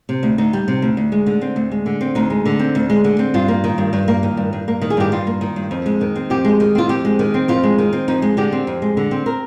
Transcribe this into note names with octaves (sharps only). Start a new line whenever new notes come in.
C3
D2
D2 D#4
G3
C3
D2
D2
G#3
D3
C4
D2
G#3
D3
C4
D2 D#4
G#3
D3
C4
D2
G#3
D3
C4
G2 F4
A#3
D#3
G2
G2
A#3
D#3
G2
G2
A#3
D#3
G#4
G2 G4
G2 F4
A#3
D#3
G2
F2
G#3
D#3
C4
F2 G4
G#3
D#3
C4 F4
F2 G4
G#3
D#3
C4
F2 F4
G#3
D#3
C4
F2 D#4
G#3
D3 G4
C4
F2
G#3
D3
C4
A#4